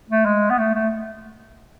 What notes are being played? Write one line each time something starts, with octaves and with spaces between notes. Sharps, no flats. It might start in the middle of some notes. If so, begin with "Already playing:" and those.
A3
G#3
B3
A3
A3